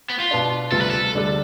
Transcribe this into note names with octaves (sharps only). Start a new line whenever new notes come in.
B3
F4
B2 B3 D4
D2 C3 G3 B3 F4 A4
B4
A4
D2 D3 G3 D4 A4